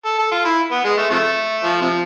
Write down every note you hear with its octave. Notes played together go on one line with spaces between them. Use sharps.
A4
A4
F4
E4
B3
G#3
A3
C3 F3 A3
F3
C3 F3